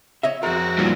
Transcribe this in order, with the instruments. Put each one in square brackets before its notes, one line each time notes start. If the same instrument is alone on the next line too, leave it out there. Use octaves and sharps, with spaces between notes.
[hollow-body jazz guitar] C#5 D#5 E5
[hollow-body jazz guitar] F2 A#4 [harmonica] G#3 C4 F#4
[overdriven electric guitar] G2 A#2